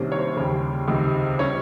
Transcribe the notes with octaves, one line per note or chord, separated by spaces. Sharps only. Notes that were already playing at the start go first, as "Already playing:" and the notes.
Already playing: C2 C3 D#3 A#3 C#4 C5
C#5
C5
D#2 C#3 G3
C#2 C3 D#3
G3 C#4 C#5